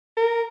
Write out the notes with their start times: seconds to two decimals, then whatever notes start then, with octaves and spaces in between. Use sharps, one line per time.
0.17 A#4